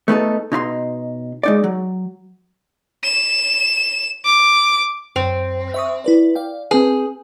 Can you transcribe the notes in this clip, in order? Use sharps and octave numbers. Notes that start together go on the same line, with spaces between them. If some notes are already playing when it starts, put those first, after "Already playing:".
A3 B3 D#4 A4
B2 D#4 D#5 C6
G#3 D#4 D5
F#3
E7
D6
F#2 C4
E5 C#6 D#6
E4 B4 D5
D5 F5 G5
C4 G#4 B4